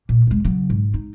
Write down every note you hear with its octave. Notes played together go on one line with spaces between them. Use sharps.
A#2
D#2 G#3
C#3 F#3
G#2
D#4